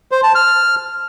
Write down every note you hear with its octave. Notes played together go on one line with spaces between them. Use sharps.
C5
A5
F6